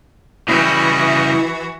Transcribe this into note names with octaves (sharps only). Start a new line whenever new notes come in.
C#3 E3 G3 E4 F#4 D#5